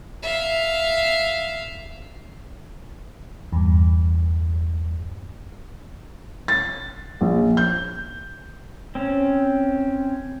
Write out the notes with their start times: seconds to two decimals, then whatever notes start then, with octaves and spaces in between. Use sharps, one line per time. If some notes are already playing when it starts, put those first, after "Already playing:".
0.22 E5 F5
3.52 E2 G2
6.48 A6
7.21 A#1
7.57 G6
8.95 C4 C#4